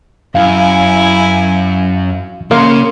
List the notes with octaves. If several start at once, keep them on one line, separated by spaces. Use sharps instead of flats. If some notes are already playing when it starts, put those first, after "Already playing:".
F#2 E4 F5 G#5
C#3 A#3 C6